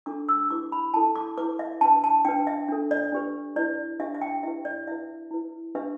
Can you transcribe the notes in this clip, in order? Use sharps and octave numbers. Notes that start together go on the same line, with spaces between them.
D4 A4 D6
E6
E4 G4 B4 D6
B5
E4 A4 A5
D6
E4 B4 D6
E5
D4 B4 A5
A5
D4 B4 G5
E5
D4 A4
D5
D4 G4 B4
E4 B4 D5
D4 G4 B4 E5
E5
G5
E4 G4 B4 E5
D5
E4 B4 E5
E4 B4
D4 G4 B4 E5